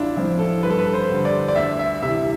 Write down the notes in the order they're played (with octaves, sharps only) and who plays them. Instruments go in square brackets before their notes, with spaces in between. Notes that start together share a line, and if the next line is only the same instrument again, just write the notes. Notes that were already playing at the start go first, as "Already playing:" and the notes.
Already playing: [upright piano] A1 D4 E4 F4
A2 F3 C4 E4
A4
G2 B4
A4
B4
C5
D3 G3
D5
D5
D2 E5
E5
C3 E3 E5